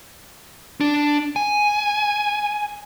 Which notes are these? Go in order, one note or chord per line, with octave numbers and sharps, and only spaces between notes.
D4
G#5